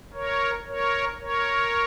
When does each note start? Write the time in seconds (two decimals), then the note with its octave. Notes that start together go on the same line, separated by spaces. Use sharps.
0.13 A#4 C#5
0.67 A#4 C#5
1.20 A#4 C#5